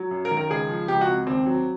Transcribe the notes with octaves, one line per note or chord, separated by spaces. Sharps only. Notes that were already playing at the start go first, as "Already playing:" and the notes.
Already playing: F#3
F#2
A#4
D#3
A#4
C#2 G#4
F3
C#2 G4
F#4
C3
D#2 C4
F#3